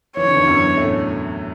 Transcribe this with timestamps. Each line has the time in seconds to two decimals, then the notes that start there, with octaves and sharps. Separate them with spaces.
0.17 E3 C#5
0.27 D3
0.36 E2 E3
0.48 F#2 F#3
0.77 A2 A3